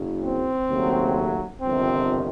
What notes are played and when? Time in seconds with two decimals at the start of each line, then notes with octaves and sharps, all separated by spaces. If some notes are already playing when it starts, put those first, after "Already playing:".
Already playing: F#1 F#2 C#3
0.22 C4
0.69 D#2 C#3 F#3 A3
1.62 G1 F2 C3 D#3 C4